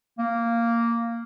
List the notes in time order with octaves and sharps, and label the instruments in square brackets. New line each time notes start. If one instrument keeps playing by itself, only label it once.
[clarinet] A#3